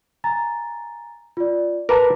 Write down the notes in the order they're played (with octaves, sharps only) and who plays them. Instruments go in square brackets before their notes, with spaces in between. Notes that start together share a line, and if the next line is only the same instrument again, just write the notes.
[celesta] G#5 A#5 A6
F4 D5
[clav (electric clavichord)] A#4 B4 A5 [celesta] D6